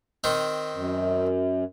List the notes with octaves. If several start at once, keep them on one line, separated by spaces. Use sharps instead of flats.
D#3 C4 D#4
F#2